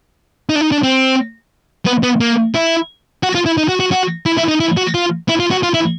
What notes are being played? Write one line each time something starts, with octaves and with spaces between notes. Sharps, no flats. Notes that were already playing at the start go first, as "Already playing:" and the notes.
D#4
D4
D#4
D4
C4
B3
B3
A#3
E4
F#4
F4
E4
D#4
F#4
F#4
F#4
E4
E4
D#4
E4
F#4
F4
E4
F4
F#4
F4
E4